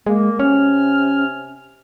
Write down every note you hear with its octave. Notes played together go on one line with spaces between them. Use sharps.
G#3 A#3
C3 C#4 G#5 F6